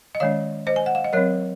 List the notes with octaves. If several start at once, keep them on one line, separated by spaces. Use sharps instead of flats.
D#5
D#3 G#3 C#4 C#5 F5
C5 D#5
G#5
F#5
F5
D#5
F#3 C4 A#4 C#5